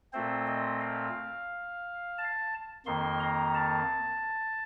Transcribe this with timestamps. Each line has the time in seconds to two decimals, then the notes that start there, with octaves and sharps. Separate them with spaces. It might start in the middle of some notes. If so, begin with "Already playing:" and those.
0.13 A#2 A3 C4 C5
0.47 D#5
0.81 F5
2.18 A5
2.86 F2 D#3 A#3 C6
3.20 A#5
3.54 A5